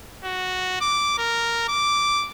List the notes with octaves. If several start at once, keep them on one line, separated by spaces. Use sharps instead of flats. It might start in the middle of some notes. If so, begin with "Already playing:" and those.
F#4
D6
A#4
D6